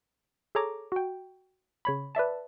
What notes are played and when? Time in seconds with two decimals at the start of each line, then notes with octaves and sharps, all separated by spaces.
0.55 G#4 A4 C#5 A#5 D6
0.92 F#4 G5
1.85 C#3 C#5 B5
2.15 B4 D5 E5 A5